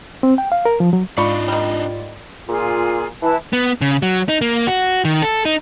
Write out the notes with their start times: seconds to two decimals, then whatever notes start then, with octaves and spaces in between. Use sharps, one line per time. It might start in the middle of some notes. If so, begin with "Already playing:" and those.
0.23 C4
0.38 G5
0.52 F5
0.65 A#4
0.80 F3
0.93 F#3
1.17 G#2 D4 D#4 F4 D5 B5 C#6
1.48 D#3 G3
2.48 A#2 F4 G#4
3.22 E3 E4 B4 A5
3.53 B3
3.81 C#3
4.02 F#3
4.29 D#4
4.41 A#3
4.67 F#4
5.05 D#3
5.22 A4
5.45 D#4